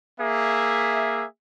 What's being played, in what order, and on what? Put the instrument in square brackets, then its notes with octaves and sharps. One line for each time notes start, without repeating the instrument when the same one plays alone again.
[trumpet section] A#3 G#4 E5